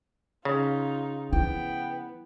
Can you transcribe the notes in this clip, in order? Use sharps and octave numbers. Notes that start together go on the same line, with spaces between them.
C#3 D#4 F4
F3 B3 E4 G5